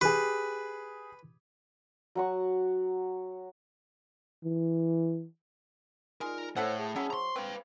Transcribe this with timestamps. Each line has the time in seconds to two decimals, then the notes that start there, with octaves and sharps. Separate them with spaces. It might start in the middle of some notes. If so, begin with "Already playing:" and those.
0.01 G4 G#4 B4
2.15 F#3 F#5 C#6
4.44 E3
6.21 G#3 D#4 F4 A#4 D5
6.56 A2 E4 A4 C5 C#5 F#5
6.79 G#4 A5 D#6
6.96 F#3 C#4 E4
7.10 C5 A#5 C6 C#6
7.36 C4 B4 F5